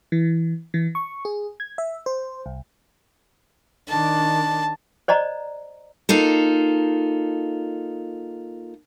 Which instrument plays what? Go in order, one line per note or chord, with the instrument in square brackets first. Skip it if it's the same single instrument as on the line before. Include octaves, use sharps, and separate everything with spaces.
[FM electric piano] E3
E3
C#6
G#4
G#6
E5
C5
C2
[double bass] D#3 D4 [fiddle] A5
[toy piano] C5 D5 D#5 A#5
[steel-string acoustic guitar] A#3 D#4 F4 A4